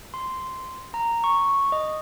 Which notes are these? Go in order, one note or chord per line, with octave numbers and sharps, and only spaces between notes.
C6
A#5
C#6
D#5